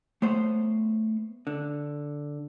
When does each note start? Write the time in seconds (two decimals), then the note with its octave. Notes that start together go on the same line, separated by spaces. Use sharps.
0.22 A3 B3 C5 C#5 F#5
1.47 D3